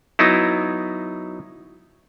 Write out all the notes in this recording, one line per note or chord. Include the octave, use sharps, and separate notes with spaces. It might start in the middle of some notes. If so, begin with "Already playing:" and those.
F#3 B3 D#4 E4